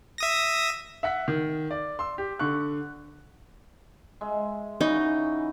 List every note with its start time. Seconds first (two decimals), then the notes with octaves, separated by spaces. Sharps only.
0.18 E5 D#6 A#6
1.03 E5 F#5 B6
1.28 D#3
1.71 D5
1.99 C6 E6
2.18 G4
2.39 D3 C#6 F#6
4.21 G#3 E5
4.81 C#3 E3 D#4 F#4